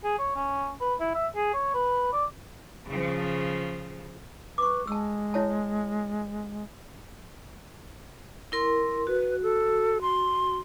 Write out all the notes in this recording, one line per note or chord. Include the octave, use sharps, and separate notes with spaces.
G#4
C#5
C#4
B4
E4
E5
G#4
C#5
B4
D5
C#3 F3
B4 C#6 D6
G#3 A5 E6
E4 C#5 A5
E4 A#4 C6
F#4 B4
A4
C6